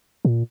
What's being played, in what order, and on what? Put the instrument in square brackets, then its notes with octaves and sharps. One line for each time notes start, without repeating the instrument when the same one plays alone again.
[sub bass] A#2